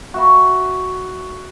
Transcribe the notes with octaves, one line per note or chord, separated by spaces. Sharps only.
F#4 E5 B5